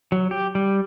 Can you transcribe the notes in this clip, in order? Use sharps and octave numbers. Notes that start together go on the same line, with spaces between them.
F#3
G4
G3